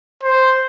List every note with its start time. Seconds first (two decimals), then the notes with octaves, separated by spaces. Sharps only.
0.23 C5